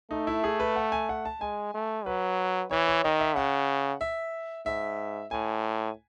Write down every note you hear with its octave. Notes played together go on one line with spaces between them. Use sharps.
A3 D#4
E4
G#4
B4
F#5
G#5
F#5
A5
G#3 G#5
A3
F#3 B4
E3 C#5
C#5
D#3 D#5
E5
C#3 F#5
E5
G#2 E5
A2 G#5